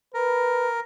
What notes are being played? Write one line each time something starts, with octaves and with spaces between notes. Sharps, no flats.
A#4 B4